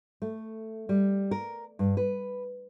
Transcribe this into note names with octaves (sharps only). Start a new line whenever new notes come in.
A3
G3
A#4
G2
B4